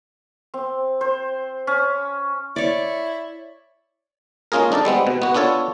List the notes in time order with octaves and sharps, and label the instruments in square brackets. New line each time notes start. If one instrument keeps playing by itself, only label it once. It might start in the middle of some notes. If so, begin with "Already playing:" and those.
[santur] C4
C5
C#4
[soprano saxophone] E4 [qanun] C#5 D5
[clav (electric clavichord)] G#3 A#3 C#4 F4 G#4 A#4
D4 D#4 A4 D5
G3 G#3 B3 C4
B2
B3 F#4
B3 D4 F4 A4 C#5